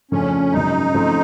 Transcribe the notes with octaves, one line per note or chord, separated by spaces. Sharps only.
F2 C#3 F3 A3 C#4 D4
G#1 F#2 C#3 D#4
C#3 F3 A3 C4